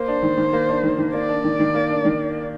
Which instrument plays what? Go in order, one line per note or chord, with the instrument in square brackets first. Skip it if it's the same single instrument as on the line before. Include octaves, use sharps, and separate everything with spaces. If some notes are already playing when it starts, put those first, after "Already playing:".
Already playing: [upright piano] A#3 [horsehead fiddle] C5
[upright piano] D4
D#3
D#3
A#3
D4
D#3
D#3
[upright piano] A#3 [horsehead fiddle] D5
[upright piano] D4
D#3
D#3
A#3
D4
D#3